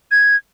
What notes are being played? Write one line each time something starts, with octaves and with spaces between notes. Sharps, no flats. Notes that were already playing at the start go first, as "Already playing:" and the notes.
G#6